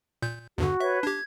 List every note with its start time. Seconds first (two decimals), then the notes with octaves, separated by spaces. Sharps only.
0.22 A#2 G6
0.58 E2 G2 D3 F#4
0.80 B4 C#5 E5
1.03 D4 G4 G#6